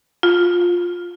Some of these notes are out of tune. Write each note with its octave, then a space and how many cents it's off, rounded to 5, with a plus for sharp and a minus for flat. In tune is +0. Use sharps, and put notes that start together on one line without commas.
F4 +10